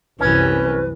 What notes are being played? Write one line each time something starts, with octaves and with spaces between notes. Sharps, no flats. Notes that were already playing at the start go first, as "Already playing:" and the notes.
C2 F#2 C3 E3 C#4 B4